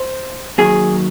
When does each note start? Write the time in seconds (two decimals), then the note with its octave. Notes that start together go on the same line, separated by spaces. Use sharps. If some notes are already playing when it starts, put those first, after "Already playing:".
Already playing: C5
0.58 D#3 F#3 A#3 G#4